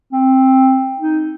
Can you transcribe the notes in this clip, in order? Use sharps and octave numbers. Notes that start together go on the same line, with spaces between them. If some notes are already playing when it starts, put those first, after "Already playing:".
C4
D#4